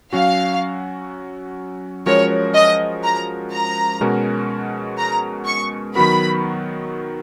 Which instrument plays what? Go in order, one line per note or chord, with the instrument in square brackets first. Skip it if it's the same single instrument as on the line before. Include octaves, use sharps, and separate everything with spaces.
[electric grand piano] F#3 C#4 F#4 [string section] F5
[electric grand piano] F3 G#3 C#4 F#4 A#4 [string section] C#5
[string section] D#5
A#5
A#5
[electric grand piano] B2 G#3 C#4 F#4 A#4
[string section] A#5
C#6
[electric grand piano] D#3 F#3 B3 F#4 A#4 [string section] B5